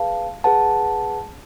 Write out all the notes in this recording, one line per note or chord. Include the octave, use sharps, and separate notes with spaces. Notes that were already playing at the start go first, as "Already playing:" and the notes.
Already playing: G#4 B4 F5 A5
G#4 B4 F#5 A5